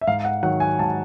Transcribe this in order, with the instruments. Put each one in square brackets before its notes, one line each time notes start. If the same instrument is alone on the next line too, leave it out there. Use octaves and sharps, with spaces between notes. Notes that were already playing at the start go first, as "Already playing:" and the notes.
[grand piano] E5
G#2 F5
F#5
D#3 F#3 F#5
G#5
G#2 A5